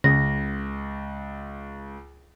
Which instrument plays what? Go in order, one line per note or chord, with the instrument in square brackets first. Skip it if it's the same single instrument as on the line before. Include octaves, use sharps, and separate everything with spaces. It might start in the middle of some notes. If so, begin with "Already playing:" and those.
[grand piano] C#2 [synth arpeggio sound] C#3 [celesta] A#6